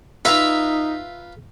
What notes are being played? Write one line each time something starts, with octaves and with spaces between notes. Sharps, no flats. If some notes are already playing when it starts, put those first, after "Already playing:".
D#4 F4 B4 E5 F5 A#5